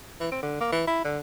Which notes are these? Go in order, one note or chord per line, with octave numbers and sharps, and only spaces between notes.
E3
C4
D3
A#3
E3
E4
D3